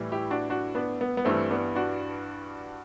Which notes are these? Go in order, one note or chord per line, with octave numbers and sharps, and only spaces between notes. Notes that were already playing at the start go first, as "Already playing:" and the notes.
Already playing: A2 E3 G3
E4 G4
D4 F#4
D4 F#4
B3 D4
B3
B3
G2 E3 G3 A3 C4
B3 D4
D4 F#4